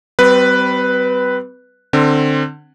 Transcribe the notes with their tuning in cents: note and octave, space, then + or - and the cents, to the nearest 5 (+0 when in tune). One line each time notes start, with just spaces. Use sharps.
G3 -30 C4 -35 B4 +0
D3 +25 C4 +15